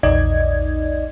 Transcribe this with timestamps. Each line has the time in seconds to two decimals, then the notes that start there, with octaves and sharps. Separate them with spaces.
0.03 A#1 E2 D#4 D5 D#5 G#6